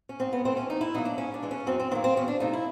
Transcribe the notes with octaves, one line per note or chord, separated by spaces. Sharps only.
C#4
G#2 C4
B3
E3 A3 C4
C#4
E2 D#4
E4
B2 F#3 A#3 D#4
D4
G#2 C#4
D4
E3 G#3
C#4
F#2 C4
C4
D#3 F#3 A#3 C4
C4
E2 C#4
D4
C3 F3 A3 D#4
E4